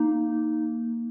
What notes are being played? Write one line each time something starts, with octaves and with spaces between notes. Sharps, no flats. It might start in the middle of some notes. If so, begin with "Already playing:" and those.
Already playing: A#3 D#4